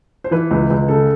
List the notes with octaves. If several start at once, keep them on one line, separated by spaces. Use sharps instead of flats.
C5
E3 B4
C#2
C#2
C#3 A4